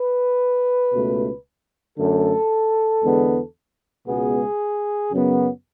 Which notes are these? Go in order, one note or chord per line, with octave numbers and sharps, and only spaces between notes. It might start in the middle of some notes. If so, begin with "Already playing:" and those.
Already playing: B4
C#2 B2 A3
F#2 D3 A3 A4
E2 D3 G#3 B3
C#2 B2 G#3 B3 G#4
F#2 C#3 F#3 B3